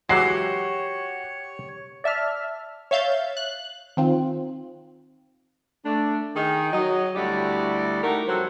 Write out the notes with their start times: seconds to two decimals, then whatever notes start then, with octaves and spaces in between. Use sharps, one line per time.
0.09 E3 F#3 G#3 F#4 G4 C#5 C7
2.04 D5 E5 A5 F6
2.91 C#5 E5 F5 G6 A6
3.37 F#6
3.97 D#3 C4 F4
5.86 A3 D4
6.36 D#3 D#4 G#4
6.72 F#3 D#5
7.15 D2 G3 E4 F#4 G4 D5
8.03 A3 D#4 E4 F#4 A#4
8.28 F2 F#3 G3 A4 C5 F#5